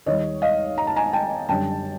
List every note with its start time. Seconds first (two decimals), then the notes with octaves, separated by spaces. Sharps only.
0.06 D#2 D#3 G3 C#5 D#5
0.42 D#5 F5
0.78 A#5
0.87 A5
0.96 G#5 A#5
1.13 G5 A5
1.49 F#2 D3 G3 G5 A5